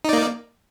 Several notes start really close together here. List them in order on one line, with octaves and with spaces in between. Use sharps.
D#4 D5 A#3